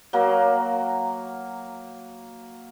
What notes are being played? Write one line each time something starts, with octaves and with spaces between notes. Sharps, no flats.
F#3 A#3